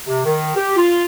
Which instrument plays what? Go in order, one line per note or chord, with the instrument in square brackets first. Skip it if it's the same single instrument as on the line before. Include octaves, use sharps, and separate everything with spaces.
[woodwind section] C3
D#3
G4
F4